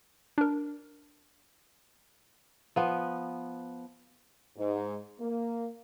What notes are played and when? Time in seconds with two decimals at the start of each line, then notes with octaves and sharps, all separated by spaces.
0.38 D4 A#4
2.76 F3 B3
4.57 G#2
5.20 A#3